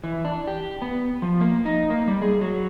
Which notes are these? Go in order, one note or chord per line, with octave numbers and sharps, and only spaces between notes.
E3
D4
G4
B3
F3
A#3
D#4
A#3
G3
G#4
F#3